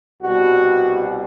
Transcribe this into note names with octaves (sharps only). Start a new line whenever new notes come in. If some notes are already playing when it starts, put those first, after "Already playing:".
C2 B2 G3 F#4